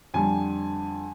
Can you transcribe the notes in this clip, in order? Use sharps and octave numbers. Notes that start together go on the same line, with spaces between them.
F2 D3 G3 G#5